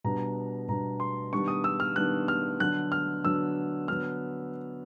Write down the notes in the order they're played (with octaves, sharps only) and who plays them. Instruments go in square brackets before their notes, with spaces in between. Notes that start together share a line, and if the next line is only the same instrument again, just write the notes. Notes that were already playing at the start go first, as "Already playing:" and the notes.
[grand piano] B2 G3 B3 D4 A#5
B2 G3 B3 D4 A#5
C6
D#3 G3 B3 D4 C#6
D#6
E6
F6
D#3 G3 B3 D4 F#6
F6
D3 F#3 B3 D4 F#6
F6
D3 F#3 B3 D4 E6
D3 F#3 B3 D4 F6